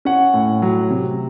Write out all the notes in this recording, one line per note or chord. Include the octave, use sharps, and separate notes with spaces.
C#4 F#5
A2
F#3
C3